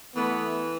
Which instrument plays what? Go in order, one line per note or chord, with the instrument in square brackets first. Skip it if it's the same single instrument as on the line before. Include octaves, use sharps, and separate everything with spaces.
[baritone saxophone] E3 [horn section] A3 B3